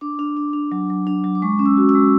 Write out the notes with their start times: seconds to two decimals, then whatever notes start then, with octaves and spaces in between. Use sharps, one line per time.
0.01 D4 D6
0.19 D4
0.37 D4
0.53 D4
0.72 F#3
0.90 F#3
1.07 D4
1.24 F#3
1.35 D6
1.42 G#3 C#6
1.59 C#4
1.66 E6
1.77 F#4
1.89 E6
1.95 G#3